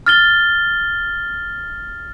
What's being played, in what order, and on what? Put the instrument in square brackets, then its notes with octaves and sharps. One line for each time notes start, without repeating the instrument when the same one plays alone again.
[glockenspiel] F6 A6 G7